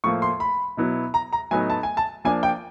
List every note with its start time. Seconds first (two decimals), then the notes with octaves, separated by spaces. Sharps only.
0.04 A2 F3 A#3 C#6
0.22 C6
0.40 B5
0.77 B2 F#3 B3 E4
1.14 A#5
1.33 A#5
1.51 A2 F#3 B3 D#4 G#5
1.70 A5
1.83 G#5
1.97 A5
2.25 F3 A#3 D4 G#5
2.43 G5